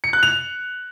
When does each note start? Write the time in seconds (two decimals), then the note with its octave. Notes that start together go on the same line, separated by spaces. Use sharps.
0.04 C#7
0.13 F#6
0.23 F7